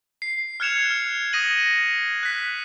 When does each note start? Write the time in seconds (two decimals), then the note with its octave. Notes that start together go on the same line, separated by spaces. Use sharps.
0.22 C7
0.60 F6 F#6 G#6 C#7 E7 F7
0.91 F6
1.33 D#6 A#6 D#7 F#7
2.23 F#6 B6